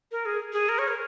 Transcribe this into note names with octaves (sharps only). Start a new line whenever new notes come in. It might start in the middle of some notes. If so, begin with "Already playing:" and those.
A#4
G#4
G#4
A#4
C#5
A#4